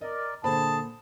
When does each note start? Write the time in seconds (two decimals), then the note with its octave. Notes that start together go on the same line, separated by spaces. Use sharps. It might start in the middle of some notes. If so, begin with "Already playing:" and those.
0.01 A#4 D5 D#5
0.44 A#2 D3 G#4 C5 A5 B5